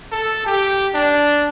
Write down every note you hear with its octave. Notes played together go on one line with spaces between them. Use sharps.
A4
G4
D4